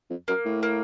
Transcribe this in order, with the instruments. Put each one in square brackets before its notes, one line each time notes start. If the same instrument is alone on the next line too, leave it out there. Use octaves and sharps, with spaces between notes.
[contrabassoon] F2
[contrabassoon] F#2 [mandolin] A#3
[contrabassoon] A2
[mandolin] A#3